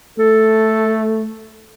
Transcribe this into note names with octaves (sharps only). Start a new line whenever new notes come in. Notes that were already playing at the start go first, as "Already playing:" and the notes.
A3 A4